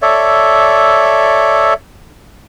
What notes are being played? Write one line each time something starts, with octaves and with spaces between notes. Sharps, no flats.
A4 C#5 D5 E5